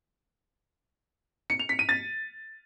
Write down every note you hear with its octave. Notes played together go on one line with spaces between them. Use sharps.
C#7
F7
B6
D#7
A6